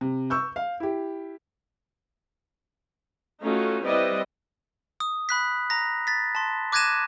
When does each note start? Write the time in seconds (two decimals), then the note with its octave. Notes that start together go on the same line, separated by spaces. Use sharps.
0.01 C3
0.30 C#6 E6 G6
0.56 F5
0.80 E4 G4
3.43 A3 C#4 D#4 F4 F#4
3.85 G3 C4 E4 B4 D5 D#5
5.00 D#6
5.29 B5 F#6 B6
5.70 A#5 A#6
6.07 A6 B6
6.35 A5 C6
6.72 D6 F#6 G#6 A#6 D#7 E7